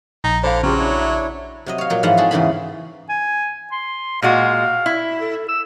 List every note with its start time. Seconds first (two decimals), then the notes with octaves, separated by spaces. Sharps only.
0.24 A#1 D#4
0.44 D3 C5 F5 B5 D6
0.63 C#3 F#3 F4 G4 G#4 F6
0.78 D4 E4 C#5
0.98 E5
1.66 C3 F#3 D#5
1.78 C#5 F5
1.90 A#2 F#3 F#4
2.03 G#2 E3 F3 B4 F5 F#5
2.17 C4 E4 F#4 G#4 A4
2.31 E2 G#2 C#3 E3 G#4 B5
3.09 G#5
3.72 C6
4.22 A#2 G#3 F#4 F5
4.86 E4
5.20 A4
5.49 E6